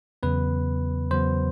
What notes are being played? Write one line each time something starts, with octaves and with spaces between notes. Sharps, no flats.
E2 C#3 F#3 B3 B4
E2 C#3 F#3 B3 C5